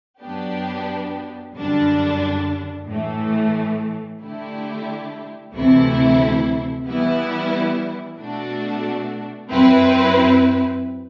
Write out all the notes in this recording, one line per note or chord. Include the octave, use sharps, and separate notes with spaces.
F#2 F#3 B3 D4 G4
F#2 D3 G3 D4
A2 E3 A3
D3 A3 E4 G4
D2 C3 E3 A3 E4
E3 G3 B3 E4
B2 A3 D4 F#4
F#2 F#3 C4 E4 B4